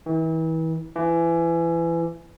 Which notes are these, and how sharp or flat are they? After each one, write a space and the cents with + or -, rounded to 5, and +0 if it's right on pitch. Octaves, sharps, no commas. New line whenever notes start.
E3 -35
E3 +25